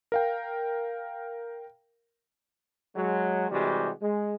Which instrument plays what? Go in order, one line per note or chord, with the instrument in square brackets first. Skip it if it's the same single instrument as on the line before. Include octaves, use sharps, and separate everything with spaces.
[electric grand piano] A#4 F5 G5
[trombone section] F#3 G#3
C3 E3 G3 G#3 F#4 G4
G#3